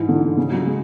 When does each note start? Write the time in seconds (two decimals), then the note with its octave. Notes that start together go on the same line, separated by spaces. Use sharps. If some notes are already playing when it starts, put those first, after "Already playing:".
Already playing: G#2 E3
0.09 D3
0.37 C#3
0.52 F#3
0.67 G#3